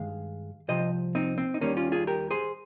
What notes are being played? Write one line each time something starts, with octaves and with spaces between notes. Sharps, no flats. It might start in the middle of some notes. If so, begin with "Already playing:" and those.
Already playing: G2 D#3 G#3 F5
C2 C3 F3 C5 D#5
C4 D#4
C4
D#4
D#2 D#3 G3 A#3 C#4
C#4 F4
F4 G#4
G4 A#4
G#4 C5